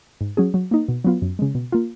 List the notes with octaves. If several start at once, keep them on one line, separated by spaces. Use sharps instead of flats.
G#2
F#3 C#4 G#4
F#3
A#3 D#4
B2
F#3 B3 F4
F#2
C#3 G#3
B2
A#3 F4